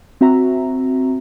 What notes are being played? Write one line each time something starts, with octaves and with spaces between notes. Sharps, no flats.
C4 F#4 E5 A#5